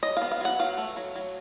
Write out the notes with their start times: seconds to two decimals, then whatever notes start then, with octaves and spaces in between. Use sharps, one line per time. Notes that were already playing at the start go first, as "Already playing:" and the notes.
0.03 F#3 D#5
0.17 B3 F5
0.32 F5
0.41 F#3 F#5
0.59 F#3 F5
0.77 A3
0.97 F#3
1.15 F#3